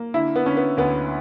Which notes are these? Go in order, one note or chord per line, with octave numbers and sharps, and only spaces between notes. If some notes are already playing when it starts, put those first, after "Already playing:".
Already playing: A#3
D3 E4
B3
D3 C#4
B3
D2 B3